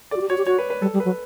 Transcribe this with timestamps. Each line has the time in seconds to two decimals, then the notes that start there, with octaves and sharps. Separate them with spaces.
0.11 A4 D5
0.16 F#4
0.21 G4
0.30 F#4 C#5
0.38 G4
0.46 F#4 C#5
0.59 B4
0.70 B4
0.81 G3 A4
0.93 G3
1.00 B4
1.05 F#3